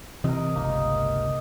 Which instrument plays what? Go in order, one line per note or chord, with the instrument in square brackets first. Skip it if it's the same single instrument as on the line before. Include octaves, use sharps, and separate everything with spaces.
[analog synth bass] C3 [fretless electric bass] E3 C4 [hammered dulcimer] A#4 D#5
[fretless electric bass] G1 C#2 [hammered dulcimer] A#3 D#4